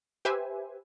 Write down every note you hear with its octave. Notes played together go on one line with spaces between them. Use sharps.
G4 B4 C5 E5 G#5